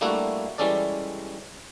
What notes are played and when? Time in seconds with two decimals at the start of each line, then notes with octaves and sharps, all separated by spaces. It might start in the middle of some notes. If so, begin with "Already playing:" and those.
0.01 G3 A3 A#3 D4 E4 F#4
0.58 E3 G3 G#3 C#4 A4 D5